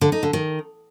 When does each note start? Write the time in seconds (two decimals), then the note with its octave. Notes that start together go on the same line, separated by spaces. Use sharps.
0.01 D3
0.12 D#4
0.23 D3
0.33 D#3